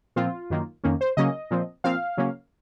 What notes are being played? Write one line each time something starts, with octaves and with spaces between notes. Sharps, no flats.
A#2 F3 C4 F4
F#2 D#3 A#3
F2 D#3 A#3 C#4
C5
C#3 F#3 A#3 C#4 D#5
A#2 F3 C4
A#2 F3 C4 F5
C#3 F#3 A#3 C#4